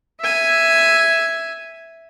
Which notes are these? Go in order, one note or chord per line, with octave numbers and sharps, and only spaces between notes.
E5 G#5